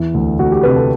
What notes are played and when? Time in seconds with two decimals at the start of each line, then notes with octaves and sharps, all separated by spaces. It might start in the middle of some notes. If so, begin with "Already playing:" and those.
Already playing: E2 E3 E4
0.14 D2
0.39 D2 F#4
0.52 G4
0.63 C3 B4
0.76 A4